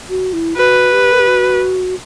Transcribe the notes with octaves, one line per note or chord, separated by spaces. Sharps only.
F#4
E4
F#4 B4
G4
A#4
G4
F#4